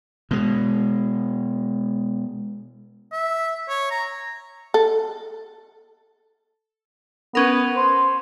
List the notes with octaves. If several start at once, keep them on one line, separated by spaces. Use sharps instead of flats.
B2 G#3
E5
C#5
A#5
A4
B3 C#4 A#4
C5